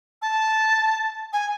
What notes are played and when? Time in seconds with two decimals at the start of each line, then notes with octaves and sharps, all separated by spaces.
0.22 A5
1.33 G#5